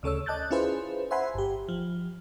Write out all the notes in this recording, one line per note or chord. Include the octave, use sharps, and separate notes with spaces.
D2 C#3 A4 C#5 E6
D5 D#5 A5 F#6 G6 A6
C#4 E4 F4 G#4 B4 C5
C5 E5 F#5 G#5 B5 C6
G1 G4
F3